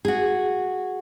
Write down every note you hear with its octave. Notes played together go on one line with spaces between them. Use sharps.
F#4 G#4